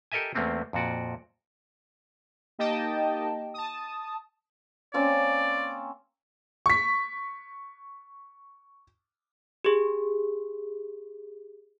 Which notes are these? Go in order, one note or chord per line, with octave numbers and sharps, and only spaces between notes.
G4 A4 A#4 D#5 E5 G#5
E2 A3 A#3 C4 C#4
F2 A#2 F#4 D5
A#3 D#4 G4 D#5 G5 A5
A5 D#6
A#3 C4 C#4 D5
C#6 B6
G4 G#4